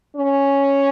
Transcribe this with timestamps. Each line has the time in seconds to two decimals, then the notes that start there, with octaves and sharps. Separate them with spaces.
0.15 C#4